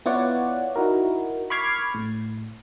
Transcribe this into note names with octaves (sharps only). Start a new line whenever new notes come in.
B3 E4 F4 C#5 D5 F#5
D#4 E4 F#4 A#4
B5 C#6 D6 F6 G#6 C7
A2